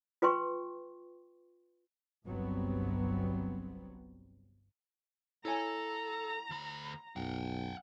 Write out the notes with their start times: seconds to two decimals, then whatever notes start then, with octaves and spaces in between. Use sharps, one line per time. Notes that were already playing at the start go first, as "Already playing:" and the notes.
0.22 F4 B4 G5 C6 C#6
2.26 G1 C2 G2 F#3 B3 C4
5.45 E4 A4 C#5 G#5 A#5
6.50 D2 B5
7.16 B1 F#2 F#5 G5